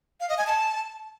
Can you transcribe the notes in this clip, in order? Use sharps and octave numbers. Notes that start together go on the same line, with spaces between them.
F5
D#5
G#5
A5